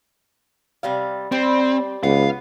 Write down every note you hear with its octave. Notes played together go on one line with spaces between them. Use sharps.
C3 G3 F5
G3 C4
C#2 B3 F5